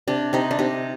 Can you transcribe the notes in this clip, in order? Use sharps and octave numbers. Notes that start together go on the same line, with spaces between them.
C3 D4
C3 D#4
D4
C3 D#4